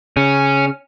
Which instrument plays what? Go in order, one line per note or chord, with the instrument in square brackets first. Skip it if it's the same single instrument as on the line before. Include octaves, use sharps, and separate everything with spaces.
[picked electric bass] C#3 [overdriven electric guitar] C#4